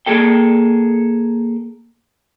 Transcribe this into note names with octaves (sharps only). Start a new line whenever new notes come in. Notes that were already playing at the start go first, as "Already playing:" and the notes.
A#3 G#4 A4 G5